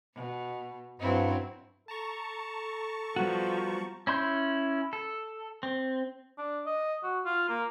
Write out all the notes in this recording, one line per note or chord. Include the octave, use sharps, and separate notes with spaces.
B2
G2 F#3 C4 E4
A4 A5 A#5 C#6
F3 G3 B3 F#4
C#4 E4 C6 G6
A4
C4
D4
D#5
F#4
F4
A#3